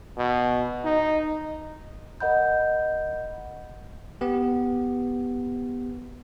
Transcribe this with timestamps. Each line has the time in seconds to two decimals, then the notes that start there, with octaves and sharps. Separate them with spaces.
0.18 B2
0.85 D#4
2.20 A#4 D#5 F#5 B5 G6
4.21 B3 G4